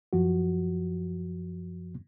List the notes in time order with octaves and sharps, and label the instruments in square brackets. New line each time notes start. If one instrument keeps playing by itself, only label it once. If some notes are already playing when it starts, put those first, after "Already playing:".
[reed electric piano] F#2 F3 F#4